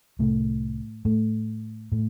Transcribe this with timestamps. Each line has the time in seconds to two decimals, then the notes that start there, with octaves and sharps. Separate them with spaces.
0.19 C2 A2 C3 A3
1.05 A2 A3
1.92 A2 A3